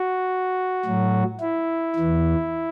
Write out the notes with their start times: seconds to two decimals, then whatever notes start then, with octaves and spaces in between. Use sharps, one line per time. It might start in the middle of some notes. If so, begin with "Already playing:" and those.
Already playing: F#4
0.85 A2 F#3
1.40 E4
1.95 E2 E3